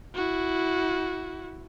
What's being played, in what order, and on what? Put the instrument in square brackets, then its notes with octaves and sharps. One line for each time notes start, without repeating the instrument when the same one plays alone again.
[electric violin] E4 F#4